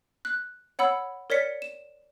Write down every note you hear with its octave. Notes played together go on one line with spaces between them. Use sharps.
F#6
C#5 F#5 B5 E6
A#4 C#5 D5 B6 C#7
E7